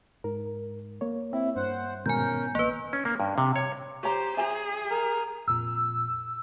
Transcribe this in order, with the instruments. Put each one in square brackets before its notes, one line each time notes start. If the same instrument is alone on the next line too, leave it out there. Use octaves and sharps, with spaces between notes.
[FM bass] G#2 [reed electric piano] A#4
[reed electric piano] A#3 C#5
[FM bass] C4 [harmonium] E4
[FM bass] G2 [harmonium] C5 F#5
[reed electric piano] G#2 B2 D#3 [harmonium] C#4 A#4 [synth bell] G#5 G6
[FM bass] A1 [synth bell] A#3 B4
[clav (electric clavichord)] C#4
A#3
G2
C3
C#5
[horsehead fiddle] G4 C5 [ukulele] C#5 A#5
[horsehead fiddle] G#4 [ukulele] E5 G#5 A#5
[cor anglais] A#4
[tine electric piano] F2 A#2 [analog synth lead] E6